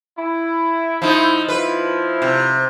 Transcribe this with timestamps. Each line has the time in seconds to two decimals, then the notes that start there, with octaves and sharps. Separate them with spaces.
0.19 E4
1.02 F3 D#4
1.49 F3 E4 B4
2.22 C3